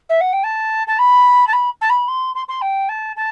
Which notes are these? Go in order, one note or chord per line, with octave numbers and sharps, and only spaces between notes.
E5
F#5
G5
A5
A5
B5
A5
B5
A5
B5
C6
C6
C6
G5
A5
A5